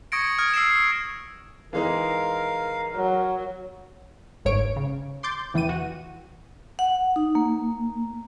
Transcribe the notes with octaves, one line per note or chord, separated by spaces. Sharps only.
C#6 D#6 G#6 A#6 C#7 D7
D#6 F6 G#6
E6 C7 D7 E7
E3 G#3 D#4 A#4 F5
F#3
G1 G#2 C#5 D7
C#3
C6 D6 G6 A6
E2 E3 G5 D#7
F#4
F#5
D#4
A#3